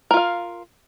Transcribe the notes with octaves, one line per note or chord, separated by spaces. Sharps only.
F4 A#4 F5